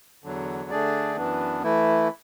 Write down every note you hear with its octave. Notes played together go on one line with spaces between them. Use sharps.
E2 D3 F#3
D3 A3 D4 G#4 D5
F#2 E3 B3 D4
E3 A3 E4